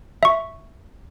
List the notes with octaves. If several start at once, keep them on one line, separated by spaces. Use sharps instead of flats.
E5 C#6